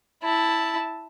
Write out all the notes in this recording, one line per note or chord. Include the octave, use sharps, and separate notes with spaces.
E4 A5